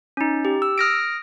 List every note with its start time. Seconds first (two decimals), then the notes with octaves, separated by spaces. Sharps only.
0.17 C#4 D#4
0.45 G4
0.62 E6
0.78 D#6 F6 A#6 D7